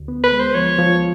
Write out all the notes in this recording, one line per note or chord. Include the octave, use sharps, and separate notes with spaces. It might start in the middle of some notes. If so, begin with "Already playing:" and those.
Already playing: D2
B3
B4
G#3
C5
F3 C#5
F3